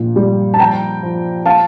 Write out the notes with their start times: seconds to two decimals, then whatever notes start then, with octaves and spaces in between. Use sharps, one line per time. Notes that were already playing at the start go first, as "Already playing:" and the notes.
Already playing: A#1 A#2
0.16 G3
0.54 A5
0.59 F3 G5 A#5
1.03 F3
1.46 F5 A5